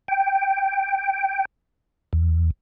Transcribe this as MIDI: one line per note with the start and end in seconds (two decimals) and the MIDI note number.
0.08 1.45 79
2.13 2.50 40